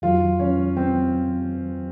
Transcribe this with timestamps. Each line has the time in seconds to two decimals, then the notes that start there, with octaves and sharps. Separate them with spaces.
0.02 F2 D#3 F#3 F4
0.40 C#4
0.77 C4